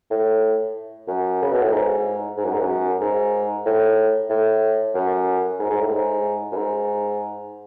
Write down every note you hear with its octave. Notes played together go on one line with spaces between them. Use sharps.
A2
F#2
C#3
B2
A2
G#2
G#2
F#2
G#2
F#2
G#2
A2
A2
F#2
G#2
G#2
A2
G#2
F#2
G#2